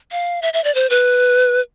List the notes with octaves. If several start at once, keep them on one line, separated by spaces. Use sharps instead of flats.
F5
E5
E5
D5
C5
B4